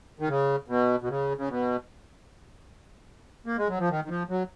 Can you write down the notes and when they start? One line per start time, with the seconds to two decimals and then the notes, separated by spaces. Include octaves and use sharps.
0.19 D#3
0.28 C#3
0.68 B2
1.02 B2
1.08 C#3
1.37 C#3
1.49 B2
3.46 A#3
3.57 G#3
3.68 F#3
3.78 F3
3.89 D#3
4.04 D#3
4.09 F3
4.29 F#3